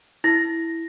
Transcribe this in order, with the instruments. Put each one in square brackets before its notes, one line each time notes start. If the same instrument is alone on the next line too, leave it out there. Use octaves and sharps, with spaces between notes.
[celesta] E4 A#6